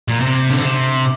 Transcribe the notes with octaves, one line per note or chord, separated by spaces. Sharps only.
A#2
C3
D3
C3